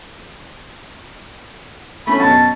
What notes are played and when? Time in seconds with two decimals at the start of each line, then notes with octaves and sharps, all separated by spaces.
2.07 A3 C#4 B5
2.20 F#2 B2 A5